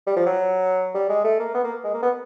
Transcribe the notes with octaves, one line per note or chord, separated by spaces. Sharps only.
G3
F3
F#3
G3
G#3
A3
A#3
B3
A#3
G#3
A#3
B3